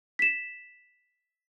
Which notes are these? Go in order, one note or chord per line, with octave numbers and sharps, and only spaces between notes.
B6 E7